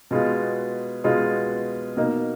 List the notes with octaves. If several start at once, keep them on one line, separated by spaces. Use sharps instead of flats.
B2 G#3 B3 F4 G#4
B2 G#3 B3 F4 G#4
B2 A#3 D#4